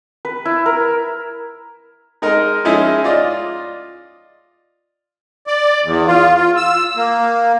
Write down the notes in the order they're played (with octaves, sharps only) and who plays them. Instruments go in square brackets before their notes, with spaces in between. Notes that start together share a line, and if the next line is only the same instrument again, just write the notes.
[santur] B4
E4
A#4
[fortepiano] G#3 D#4 A#4 D#5
F3 G#3 C#4 D#4 E4 G#4
F4 D5 D#5
[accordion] D5
E2
F4
F4
E6
A#3